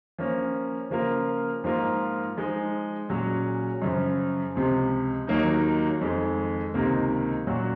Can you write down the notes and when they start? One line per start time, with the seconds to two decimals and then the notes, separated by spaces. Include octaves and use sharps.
0.18 F3 A#3 C#4
0.90 C#3 F3 A#3 F4 A#4
1.64 G#2 F3 A#3 F4 A#4
2.37 F3 G#3 D#4
3.09 A#2 F#3 C#4 G#4
3.82 F#2 C#3 F3
4.56 C#2 C3 F3
5.27 D#2 D#3 F#3 A#3 D#4
6.01 F2 D#3 G#3
6.74 C#2 C3 D#3 A#3
7.47 A#2 F#3 C#4 F#4